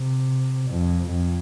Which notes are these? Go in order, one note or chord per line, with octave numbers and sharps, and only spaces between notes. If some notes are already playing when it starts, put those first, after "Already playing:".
Already playing: C3
F2
F2